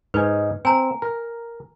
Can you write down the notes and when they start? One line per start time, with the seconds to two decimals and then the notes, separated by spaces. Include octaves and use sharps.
0.14 G#2 D#4 B4 G#5
0.65 C4 G#5 A#5
1.02 A#4